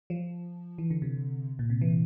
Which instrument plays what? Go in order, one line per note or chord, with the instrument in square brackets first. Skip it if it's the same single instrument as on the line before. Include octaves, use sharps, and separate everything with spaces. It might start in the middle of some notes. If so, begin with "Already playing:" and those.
[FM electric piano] F3
E3
D3
C3
A#2
C3
E3